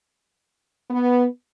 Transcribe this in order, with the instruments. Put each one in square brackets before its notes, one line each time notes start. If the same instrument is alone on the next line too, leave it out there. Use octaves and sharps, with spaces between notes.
[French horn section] B3